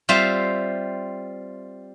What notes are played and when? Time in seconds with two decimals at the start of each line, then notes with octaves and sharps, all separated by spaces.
0.09 G3 C4 F4 E5 F5